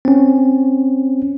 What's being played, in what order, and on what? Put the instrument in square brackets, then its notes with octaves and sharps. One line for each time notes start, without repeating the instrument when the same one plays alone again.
[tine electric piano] C4 C#4